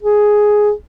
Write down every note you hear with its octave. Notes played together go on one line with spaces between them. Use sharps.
G#4